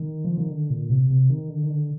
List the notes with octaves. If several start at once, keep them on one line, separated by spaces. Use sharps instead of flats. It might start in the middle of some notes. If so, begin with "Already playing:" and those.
Already playing: D#3
F3
D#3
D3
A#2
C3
C3
D#3
D3
D#3
D3